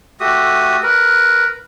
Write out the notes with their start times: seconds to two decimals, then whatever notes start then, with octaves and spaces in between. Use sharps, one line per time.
0.20 A3 F#4 G4 D#6
0.83 A#4 B4